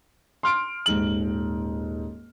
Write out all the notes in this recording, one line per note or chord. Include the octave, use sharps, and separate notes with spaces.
C6 F6 D7
D#1 G#2 F#7